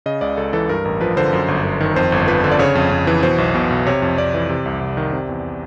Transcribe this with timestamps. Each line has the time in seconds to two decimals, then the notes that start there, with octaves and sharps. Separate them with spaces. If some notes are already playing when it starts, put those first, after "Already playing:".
0.06 C#3 D#5
0.21 C#2 D5
0.37 C#2 A4
0.53 E3 A4
0.69 G2 A#4
0.85 A1 A#4
1.01 F3 B4
1.17 D3 C5
1.33 F#2
1.48 G1
1.65 G1
1.81 D#3
1.96 F2 C5
2.12 G1
2.28 F3 B4
2.44 D3
2.52 D5
2.59 C#3 C#5
2.75 F2
2.91 F2
3.07 E3
3.23 B2 C5
3.38 B1
3.55 B2
3.70 B1
3.86 C3 C#5
4.02 F2
4.18 F2 D5
4.34 E3
4.49 C3
4.66 C2
4.81 C2
4.97 D#3
5.13 C3
5.29 E2